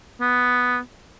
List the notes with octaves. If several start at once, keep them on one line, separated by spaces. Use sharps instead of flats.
B3